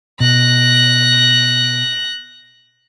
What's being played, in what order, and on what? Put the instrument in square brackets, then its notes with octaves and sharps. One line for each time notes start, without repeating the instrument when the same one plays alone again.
[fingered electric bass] B2 [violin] F#6 A#6